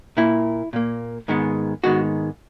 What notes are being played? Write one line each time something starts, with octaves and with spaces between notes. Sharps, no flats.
A#2 A#3 E4
A#2 A#3
G#2 D#3 G#3 B3
G#2 D#3 G#3 B3 F#4